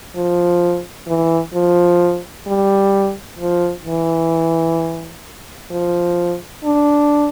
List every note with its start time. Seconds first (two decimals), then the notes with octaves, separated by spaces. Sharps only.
0.15 F3
1.08 E3
1.54 F3
2.47 G3
3.39 F3
3.85 E3
5.70 F3
6.64 D4